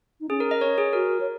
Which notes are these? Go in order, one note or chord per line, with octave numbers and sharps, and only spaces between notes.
D#4
C#4 G#4
A#4
D#5
C#5
G#4
F#4 A#4
C#5